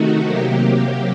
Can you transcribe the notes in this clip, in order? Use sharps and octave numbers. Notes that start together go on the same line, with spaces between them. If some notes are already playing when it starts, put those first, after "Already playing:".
Already playing: C3 D#3 A3 D#4 F#4
C3 F#3 A#3 G4